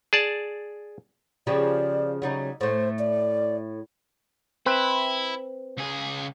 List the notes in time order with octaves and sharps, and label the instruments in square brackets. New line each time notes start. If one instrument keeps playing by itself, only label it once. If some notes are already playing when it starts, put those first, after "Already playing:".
[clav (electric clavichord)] G#4 D5 A5
[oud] C#3 F3 G4 [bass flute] D5
[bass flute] C#3 [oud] F#3 G3 D#4
[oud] A2 A3 [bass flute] C5
[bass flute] D5
[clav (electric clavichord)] C4 B4 [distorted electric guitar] E4
[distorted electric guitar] C#2 G#4